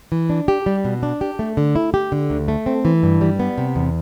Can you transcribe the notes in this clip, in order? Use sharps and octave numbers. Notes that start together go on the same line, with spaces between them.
E3
D4
G4
G3
B2
D4
G4
A3
D3
E4
G4
D3
D2
A3
C4
E3
G2
G3
B3
C3
E2